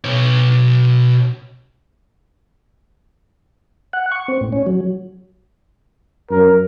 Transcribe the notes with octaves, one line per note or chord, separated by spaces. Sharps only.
B2 C#5
F#5
C#6
C4
A2
C#4
F#3
F#2 A#4